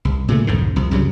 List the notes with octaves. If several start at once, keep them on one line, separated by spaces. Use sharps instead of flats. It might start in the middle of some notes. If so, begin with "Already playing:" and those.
C2
A#2 C#3 A3
B1 F2 G#2 D3
C2 F2
C2 F#2 C#3 F#3